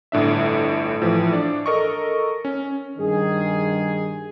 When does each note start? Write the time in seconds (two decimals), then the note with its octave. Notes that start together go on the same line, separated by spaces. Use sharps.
0.12 G1 A2 D4 E5
1.02 A2 E3 F3
1.33 D4 D5
1.66 A4 A#4 D#5 C#6
2.45 C#4
2.98 G2 D#3 G#4